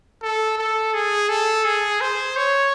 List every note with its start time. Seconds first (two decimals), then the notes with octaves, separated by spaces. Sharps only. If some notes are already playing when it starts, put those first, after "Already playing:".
0.23 A4
0.58 A4
0.94 G#4
1.29 A4
1.65 G#4
2.01 C5
2.37 C#5